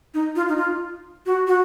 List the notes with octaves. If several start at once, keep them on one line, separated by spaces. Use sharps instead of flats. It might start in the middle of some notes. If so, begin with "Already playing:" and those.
D#4
F4
D#4
F4
F#4
F#4